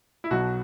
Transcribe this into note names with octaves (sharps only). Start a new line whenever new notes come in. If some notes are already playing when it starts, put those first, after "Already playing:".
E4
B1 B2 F#3 F#4